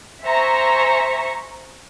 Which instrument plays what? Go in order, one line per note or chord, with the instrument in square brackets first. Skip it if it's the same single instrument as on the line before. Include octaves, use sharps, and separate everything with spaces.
[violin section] C5 E5 G#5 A#5 C#6